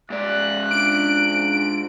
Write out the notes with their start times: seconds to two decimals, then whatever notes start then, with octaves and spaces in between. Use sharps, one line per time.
0.10 G#2 D5 F#6
0.71 D4 F4 D7